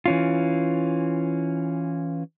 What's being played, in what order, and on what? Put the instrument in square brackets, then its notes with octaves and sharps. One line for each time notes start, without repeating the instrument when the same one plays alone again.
[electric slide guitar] E3 C#4 F4